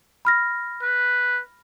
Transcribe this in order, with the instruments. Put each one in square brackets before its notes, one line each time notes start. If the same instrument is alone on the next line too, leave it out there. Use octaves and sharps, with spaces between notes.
[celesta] B5 F6 A#6
[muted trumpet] B4